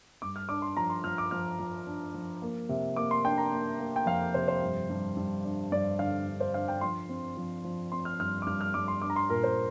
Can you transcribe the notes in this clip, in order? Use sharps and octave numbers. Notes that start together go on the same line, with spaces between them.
G2 D6
F6
D4 D6
C6
F3 A#5
C6
F3 F6
D6
F3 F6
F3
D4
F3
A#3
C3
A#3 D6
C6
D4 G5
A#5
A#3
A#3
G5
F2 F5
C3 C5
C5
G2
G2
G2
D4
G2 D5
D3 F5
D4
C5
D4 F5
G5
F3 C6
C4
F3
F3
C4 C6
F6
G2 F6
D6
G2 F6
F6
G2 D6
C6
D4 D6
A#5
C6
A#2 A#4
C5